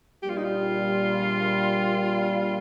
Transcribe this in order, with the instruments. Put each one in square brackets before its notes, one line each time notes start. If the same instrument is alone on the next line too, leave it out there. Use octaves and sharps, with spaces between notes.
[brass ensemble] A#1 A#2 G3 [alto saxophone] G4
[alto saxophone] F4
D#4
F4